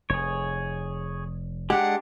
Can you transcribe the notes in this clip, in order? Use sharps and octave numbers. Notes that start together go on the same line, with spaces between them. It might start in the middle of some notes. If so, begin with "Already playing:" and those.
F1 G#4 C#5
G#3 D4 G4 F#5